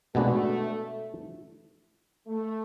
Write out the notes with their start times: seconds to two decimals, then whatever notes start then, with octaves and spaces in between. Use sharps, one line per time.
0.15 B2 G#3 A3 B3 D4 F#4
2.27 A3